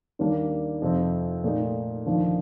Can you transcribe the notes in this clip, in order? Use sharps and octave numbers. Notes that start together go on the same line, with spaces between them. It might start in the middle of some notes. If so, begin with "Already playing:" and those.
D#2 D#3 G3 A#3 D4
F2 C3 F3 C4
A#2 A3 D#4
D#2 D3 F3